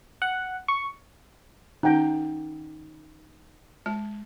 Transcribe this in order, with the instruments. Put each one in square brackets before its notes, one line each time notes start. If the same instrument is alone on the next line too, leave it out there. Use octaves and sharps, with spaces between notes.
[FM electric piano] F#5
C#6
[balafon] D#3 C#4 [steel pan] D#4 F#5 G5
[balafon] G#3 A5